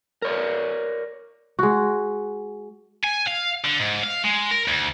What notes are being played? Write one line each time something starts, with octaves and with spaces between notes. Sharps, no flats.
A#4 C#5 D5
G#3 F#4
G#5
F5
D3
G#2
F5
G#3
A#4
D2